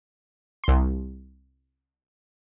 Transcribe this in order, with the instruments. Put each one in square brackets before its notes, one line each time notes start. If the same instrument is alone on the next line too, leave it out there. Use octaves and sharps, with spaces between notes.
[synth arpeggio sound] C2 C6